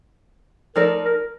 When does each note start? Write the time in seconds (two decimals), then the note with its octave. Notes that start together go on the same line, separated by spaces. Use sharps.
0.76 F3 A3 D#4 A4 A#4 D5
1.05 A#4